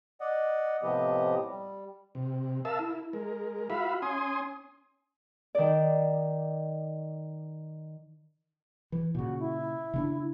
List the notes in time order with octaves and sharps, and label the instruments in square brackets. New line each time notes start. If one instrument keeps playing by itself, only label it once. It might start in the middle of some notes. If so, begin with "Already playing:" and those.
[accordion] D5 D#5 F#5
A2 C3 F3 B3 G4 D#5
G3
[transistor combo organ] C3
A#4 E5 F5 A5 E6
E4
G#3 A#4
F4 F#4 E5 F5 B5
C#4 G#5 C6 D#6
[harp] D#3 D5
[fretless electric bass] E3
[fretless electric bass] A#2 C#3 [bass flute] F#4
[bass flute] E4
[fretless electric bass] C#3 C4 D4